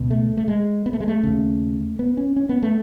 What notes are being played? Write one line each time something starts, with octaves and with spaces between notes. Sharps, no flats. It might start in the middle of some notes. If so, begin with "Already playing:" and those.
Already playing: C#2 B2
A3
A3
G#3
B3
A3
G#3
A3
D#2 C#3
B3
C#4
C#4
B3
A3